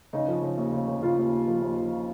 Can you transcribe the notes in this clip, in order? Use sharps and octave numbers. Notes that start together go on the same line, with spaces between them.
C#3 D#4
F3
C#3
D#2
C#3
C#3
C#3 F4
D#2
D#2
F3
D#2
F3